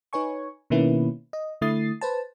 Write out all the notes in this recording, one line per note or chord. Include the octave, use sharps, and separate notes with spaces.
D#4 B4 C#5 G#5 C#6
B2 D#3 A#3 C#4 E4 B4
D#5
D3 A3 E4 D#6 A6 C7
B4 C5 A5